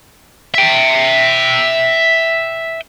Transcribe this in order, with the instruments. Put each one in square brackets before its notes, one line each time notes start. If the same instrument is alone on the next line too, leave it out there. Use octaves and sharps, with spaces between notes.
[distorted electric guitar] E5 G5